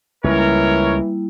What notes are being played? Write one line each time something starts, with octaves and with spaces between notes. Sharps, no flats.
C#2 E3 G3 A#3 E4 A#4 C#5